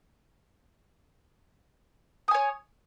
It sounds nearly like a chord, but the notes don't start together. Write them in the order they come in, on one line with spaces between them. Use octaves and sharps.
D#6 G#5 C#5